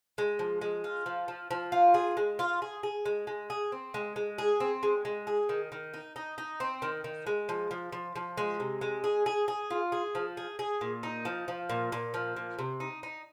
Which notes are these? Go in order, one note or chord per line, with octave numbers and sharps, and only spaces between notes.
G#3
F3
G#3
F4
F3
F3
F3
F4
G#4
G#3
F4
G#4
G#4
G#3
G#3
G#4
C4
G#3
G#3
G#4
C4
G#3
G#3
G#4
D#3
D#3
D#4
D#4
D#4
C4
D#3
D#3
G#3
F3
F3
F3
F3
G#3
C3
G#3
G#4
G#4
G#4
F4
G#4
F3
G#4
G#4
A#2
D#4
F3
F3
A#2
A#2
F3
A#2
C3
D#4
D#4